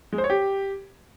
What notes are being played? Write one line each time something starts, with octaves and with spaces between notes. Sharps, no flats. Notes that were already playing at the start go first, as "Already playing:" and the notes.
G#3
C5
C#5
G4